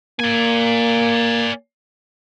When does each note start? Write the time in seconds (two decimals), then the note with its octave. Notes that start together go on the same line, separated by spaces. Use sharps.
0.20 A#3 D5 G#5